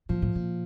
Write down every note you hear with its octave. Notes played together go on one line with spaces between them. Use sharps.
A#2 F3
A2
A#2